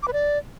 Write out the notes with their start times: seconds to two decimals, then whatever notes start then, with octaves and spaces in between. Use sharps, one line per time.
0.03 D6
0.08 B4
0.13 D5